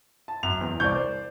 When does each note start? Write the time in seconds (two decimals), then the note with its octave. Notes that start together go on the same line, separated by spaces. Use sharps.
0.28 A5
0.43 F#2 F7
0.61 E2
0.80 C2 D5 C#6 G6
0.96 C5